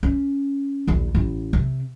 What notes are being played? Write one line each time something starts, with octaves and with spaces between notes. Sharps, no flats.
C#4
A#1 D#2
A1
C3